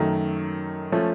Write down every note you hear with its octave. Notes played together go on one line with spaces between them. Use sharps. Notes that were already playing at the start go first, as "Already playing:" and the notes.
Already playing: F#2 D#3 F#3 A3
F3 A3 C#4